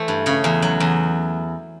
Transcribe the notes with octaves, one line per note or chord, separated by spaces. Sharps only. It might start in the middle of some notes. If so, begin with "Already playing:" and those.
Already playing: E3 A3 C5
G2
C#3 C#5
E2
F#3
E2